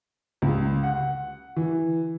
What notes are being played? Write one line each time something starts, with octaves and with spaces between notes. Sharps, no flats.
C#2
F#5
E3